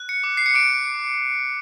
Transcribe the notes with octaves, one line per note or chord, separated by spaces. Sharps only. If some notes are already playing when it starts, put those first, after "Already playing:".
Already playing: F#6
C#7
D6
C7
C#7
D6 D7